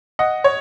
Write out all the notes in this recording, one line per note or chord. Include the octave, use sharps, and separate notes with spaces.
D#5 F#5
C#5